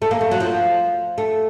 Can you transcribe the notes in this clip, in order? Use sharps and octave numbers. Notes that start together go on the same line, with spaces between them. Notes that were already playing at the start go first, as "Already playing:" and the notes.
A3
A#3
A3
F#3
F3
A3